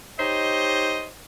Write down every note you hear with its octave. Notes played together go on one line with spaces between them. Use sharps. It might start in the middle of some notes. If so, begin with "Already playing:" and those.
D#4 G4 C5 C#5 D#5